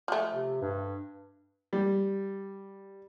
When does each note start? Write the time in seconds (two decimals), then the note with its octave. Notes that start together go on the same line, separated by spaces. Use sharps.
0.08 F3 A3
0.33 C3
0.61 G2
1.73 G3